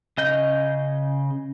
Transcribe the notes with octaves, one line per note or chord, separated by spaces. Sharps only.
C#3 D#5 G6